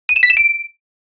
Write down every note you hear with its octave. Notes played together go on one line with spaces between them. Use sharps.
D#7
E7
B6
E7
D7